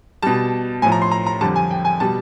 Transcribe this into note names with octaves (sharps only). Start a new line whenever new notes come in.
B2 G3 A5
A2 F3 G#5
A#5
C6
A#5
A#5
F2 D3 G3 A5
G#5
G5
G#5
B2 G3 A5